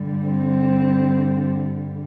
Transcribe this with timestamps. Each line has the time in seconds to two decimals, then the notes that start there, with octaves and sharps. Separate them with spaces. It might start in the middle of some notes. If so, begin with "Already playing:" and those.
Already playing: G2 D3 G3
0.26 C4